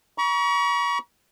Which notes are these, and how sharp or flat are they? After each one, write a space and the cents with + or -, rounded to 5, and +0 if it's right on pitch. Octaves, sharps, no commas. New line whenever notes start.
A#5 +45 C#6 +30